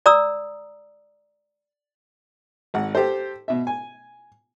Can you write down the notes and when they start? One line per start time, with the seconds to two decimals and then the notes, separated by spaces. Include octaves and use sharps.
0.06 D5 A#5 D#6 E6
2.74 G#1 F#5
2.95 G4 A4 C5
3.48 B2 E5
3.67 G#5